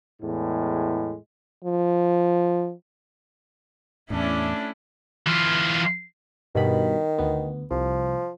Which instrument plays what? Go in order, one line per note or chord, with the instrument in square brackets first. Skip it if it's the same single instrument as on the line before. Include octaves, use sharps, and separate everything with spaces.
[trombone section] E2 A2 G#3
[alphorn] F3
[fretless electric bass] E2 A2 [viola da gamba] A3 C#4 E4 [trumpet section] D4
[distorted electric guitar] E3 F4
[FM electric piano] G2 B2 B5 [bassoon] D#3
[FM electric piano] D2 B3
[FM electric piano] C2 [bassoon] F3